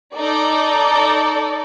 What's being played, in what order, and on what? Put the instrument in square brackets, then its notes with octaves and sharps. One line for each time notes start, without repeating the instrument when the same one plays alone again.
[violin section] D#4 A4 D5